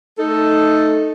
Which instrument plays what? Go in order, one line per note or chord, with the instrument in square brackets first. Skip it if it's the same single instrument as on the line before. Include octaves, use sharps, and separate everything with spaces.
[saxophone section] A3 D#4 A4